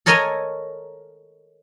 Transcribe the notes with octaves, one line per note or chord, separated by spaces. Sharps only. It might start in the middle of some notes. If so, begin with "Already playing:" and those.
A4 A#4 C#5 D#5 G#5 A#5